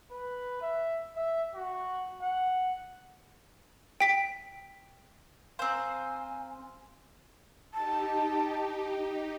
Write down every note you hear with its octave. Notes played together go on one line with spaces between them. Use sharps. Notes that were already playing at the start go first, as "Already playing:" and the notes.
B4
E5
E5
F#4
F#5
G5 B6
C4 C5 F5 G#5 A#5
D#4 G4 A5